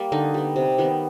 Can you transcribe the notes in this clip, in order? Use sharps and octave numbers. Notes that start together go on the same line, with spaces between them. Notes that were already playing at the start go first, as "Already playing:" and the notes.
Already playing: G3 A#3
D3 D#4
G3 B3
C3
D#3 G3 B3